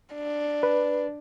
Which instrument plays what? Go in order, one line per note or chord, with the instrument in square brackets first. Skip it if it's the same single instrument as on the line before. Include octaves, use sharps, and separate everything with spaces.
[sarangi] D4
[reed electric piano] B4